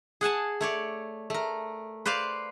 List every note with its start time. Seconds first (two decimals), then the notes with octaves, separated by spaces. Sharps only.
0.21 G#4 F#5 G#5 A5
0.61 A3 C#5 D5
1.30 A3 A#4
2.05 B4 C5 D5 F5